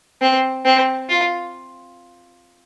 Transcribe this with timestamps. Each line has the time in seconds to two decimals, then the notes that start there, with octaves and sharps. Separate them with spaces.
0.22 C4
0.65 C4
1.09 F4